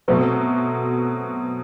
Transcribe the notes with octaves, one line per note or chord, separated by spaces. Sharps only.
B2 F#3 A3 C4